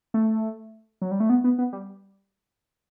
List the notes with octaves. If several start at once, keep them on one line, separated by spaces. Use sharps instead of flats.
A3
F#3
G3
A3
B3
B3
B3
G3